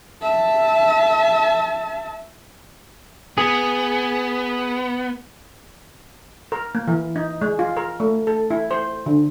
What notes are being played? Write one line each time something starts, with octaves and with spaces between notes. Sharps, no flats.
E5 A5
B3 G#4
A#4
A#3
E3
D#4
G#3
F4
A#4
A3
A4
E4
C5
D3